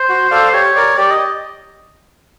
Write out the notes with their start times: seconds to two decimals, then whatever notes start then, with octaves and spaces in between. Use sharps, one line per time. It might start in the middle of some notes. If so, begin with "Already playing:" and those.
Already playing: C5
0.09 F#4
0.31 A4 D5 F5
0.53 G4 C#5
0.75 A#4 D5
0.98 G4 D5
1.11 D#5